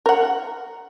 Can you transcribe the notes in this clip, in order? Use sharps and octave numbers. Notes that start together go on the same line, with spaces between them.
A#4 F#5